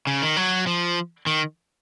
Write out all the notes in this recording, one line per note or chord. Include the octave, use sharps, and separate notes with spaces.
C#3
D#3
F#3
F3
D#3